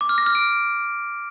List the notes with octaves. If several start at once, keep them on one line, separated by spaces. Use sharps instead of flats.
D6
F6
A#6
F6
D7